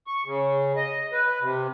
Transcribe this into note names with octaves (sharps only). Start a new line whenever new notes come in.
C#6
C#3
D#5
B4
C3